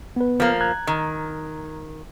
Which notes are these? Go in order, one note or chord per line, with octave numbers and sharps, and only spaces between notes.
B3 B4
F3 A#3
A#5 F#6 G#6
D#3